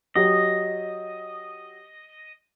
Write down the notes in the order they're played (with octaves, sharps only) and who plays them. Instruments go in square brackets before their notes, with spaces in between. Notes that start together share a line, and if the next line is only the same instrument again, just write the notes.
[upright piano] F#3 G4 [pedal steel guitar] D#5